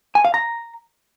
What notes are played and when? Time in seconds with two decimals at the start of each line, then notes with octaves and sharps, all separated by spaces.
0.15 G#5
0.25 F5
0.34 A#5